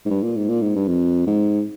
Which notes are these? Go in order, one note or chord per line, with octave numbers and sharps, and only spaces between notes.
G#2
G2
A#2
G#2
A#2
G#2
G2
F2
G#2